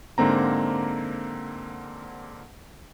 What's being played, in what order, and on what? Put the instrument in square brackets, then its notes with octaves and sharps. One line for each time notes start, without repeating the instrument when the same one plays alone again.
[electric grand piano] G#2 D3 A#3 C4 A#5